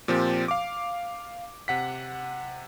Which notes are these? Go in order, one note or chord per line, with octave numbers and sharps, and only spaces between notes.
A#2 F3 C4 G4
F5 D6
C3 F#5 B6